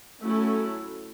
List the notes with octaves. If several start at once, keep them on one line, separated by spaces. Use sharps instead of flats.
F#3 A3 C#4 E4 A4